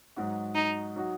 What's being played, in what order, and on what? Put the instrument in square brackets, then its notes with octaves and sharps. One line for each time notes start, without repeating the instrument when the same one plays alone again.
[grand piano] G#2 F#3 D#4 F#4
[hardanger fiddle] D#4
[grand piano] F#3 D#4 F#4